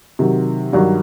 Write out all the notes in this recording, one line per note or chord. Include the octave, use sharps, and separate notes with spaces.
C3 D#3 F#3
G2 D#3 F#3